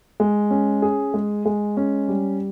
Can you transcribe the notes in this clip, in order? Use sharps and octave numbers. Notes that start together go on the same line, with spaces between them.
G#3
C#4
G#4
G#3
G#3
C#4
G3